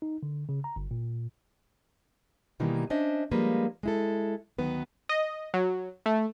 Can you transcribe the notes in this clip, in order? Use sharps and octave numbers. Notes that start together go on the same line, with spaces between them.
D#4
D3
C#3
A#5
G1
A#2
B2 D#3 E3 G3 A#3 D#4
C#4 D4 C5 D#5 E5
F3 G3 G#3 A#3 B4
G#3 E4 A4
D2 D#3 F#3 B3 B4
D#5
F#3
A3